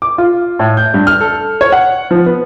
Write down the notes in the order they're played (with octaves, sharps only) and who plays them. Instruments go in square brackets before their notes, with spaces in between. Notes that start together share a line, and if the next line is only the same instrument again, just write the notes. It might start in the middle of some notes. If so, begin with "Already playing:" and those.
[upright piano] D6
F4
A2
G6
G2
F6
A4
C#5
F#5
F3
B3